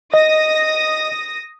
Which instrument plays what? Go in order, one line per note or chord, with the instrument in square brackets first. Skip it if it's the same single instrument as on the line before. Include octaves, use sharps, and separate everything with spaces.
[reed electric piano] D#5 [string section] D#6 A#6